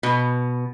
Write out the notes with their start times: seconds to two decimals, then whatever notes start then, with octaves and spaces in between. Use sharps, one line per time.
0.03 B2